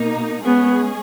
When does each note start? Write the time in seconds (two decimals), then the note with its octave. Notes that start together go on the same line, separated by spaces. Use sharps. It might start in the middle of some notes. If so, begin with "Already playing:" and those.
Already playing: B2 A#3 D#4
0.45 G#3 B3 C#4 G#4